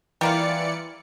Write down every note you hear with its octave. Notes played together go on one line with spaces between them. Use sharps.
E3 G3 A#3 F4 D5 C#7